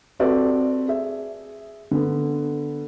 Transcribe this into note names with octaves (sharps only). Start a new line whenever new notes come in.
C4 F#4 G4 A4 B4 D5
G#4 E5
D3 B3